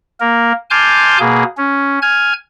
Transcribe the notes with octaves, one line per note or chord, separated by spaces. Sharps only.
A#3 A#4
G#5 A5 C6 D6 F6 G6
B2 A#3 G#4
C#4
G#5 F6 G#6